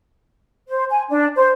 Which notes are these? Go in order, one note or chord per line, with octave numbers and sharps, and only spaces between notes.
C5
G#5
D4
C5